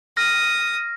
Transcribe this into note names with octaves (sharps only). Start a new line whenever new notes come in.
D#6 F6 A#6